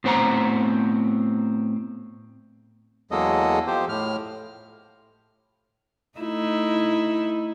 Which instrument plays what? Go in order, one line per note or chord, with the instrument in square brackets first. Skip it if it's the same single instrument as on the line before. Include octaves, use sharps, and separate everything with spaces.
[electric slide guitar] A2 B3 C4 C5 F#5 A#5
[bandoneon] E2 F#3 G#3 A#3 A4 D#5
F3 G4 C5
A2 F6
[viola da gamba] A3 D#4 E4